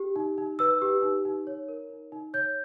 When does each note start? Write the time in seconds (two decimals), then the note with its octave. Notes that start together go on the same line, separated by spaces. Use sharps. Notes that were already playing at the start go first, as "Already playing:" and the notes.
Already playing: G4
0.16 D#4
0.38 D#4
0.59 B4 E6
0.82 G4
1.02 D#4
1.25 D#4
1.47 C#5
1.68 A#4
1.90 D#4
2.12 D#4
2.34 C#5 G6